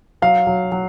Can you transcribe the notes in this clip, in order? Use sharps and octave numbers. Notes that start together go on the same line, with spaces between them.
F#3 F5
F#3
F#3